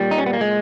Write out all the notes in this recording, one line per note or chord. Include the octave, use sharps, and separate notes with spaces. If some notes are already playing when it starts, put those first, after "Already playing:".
Already playing: A#2 G3
D#4
C#4
B3
A#3
G#3